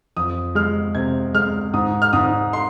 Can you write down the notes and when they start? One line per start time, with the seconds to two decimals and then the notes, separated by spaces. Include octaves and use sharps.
0.17 F2 D#6
0.55 G#3 F6
0.95 C3 G#6
1.34 G#3 F6
1.74 G#2 D#6
2.02 F6
2.13 G#2 D#6
2.53 C6